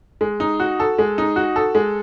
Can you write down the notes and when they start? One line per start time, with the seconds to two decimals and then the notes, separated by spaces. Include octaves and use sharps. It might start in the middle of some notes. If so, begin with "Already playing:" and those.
0.21 G#3
0.40 D#4
0.60 F#4
0.80 A4
0.99 G#3
1.18 D#4
1.36 F#4
1.56 A4
1.75 G#3